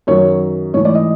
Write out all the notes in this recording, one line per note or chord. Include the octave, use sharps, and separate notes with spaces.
F#2 D#3 F#3 C#5
G#2 E3 A3 C#5
D5
D#5